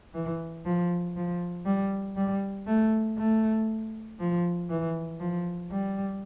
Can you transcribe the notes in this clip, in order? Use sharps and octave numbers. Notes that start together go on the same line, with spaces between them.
E3
F3
F3
G3
G3
A3
A3
F3
E3
F3
G3